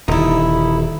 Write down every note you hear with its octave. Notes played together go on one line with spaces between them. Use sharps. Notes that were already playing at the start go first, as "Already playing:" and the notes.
D#1 D3 D#4 E4